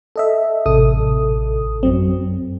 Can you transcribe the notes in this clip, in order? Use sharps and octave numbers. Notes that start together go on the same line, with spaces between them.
A4 D#5 E5
A1 C3 A4 D#6
F#2 F#3 C4